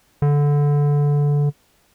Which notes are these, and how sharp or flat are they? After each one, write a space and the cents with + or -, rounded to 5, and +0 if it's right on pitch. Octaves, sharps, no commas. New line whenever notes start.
D3 -15